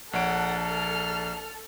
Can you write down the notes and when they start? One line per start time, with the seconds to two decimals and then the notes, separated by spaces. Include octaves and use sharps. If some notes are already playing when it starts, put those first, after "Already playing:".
0.13 A#1 A4 C#5 F#5 D7
0.64 F6